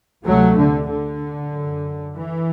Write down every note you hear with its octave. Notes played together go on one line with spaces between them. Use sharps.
D2 C3 F#3 A3
D3
D3
F#2
E3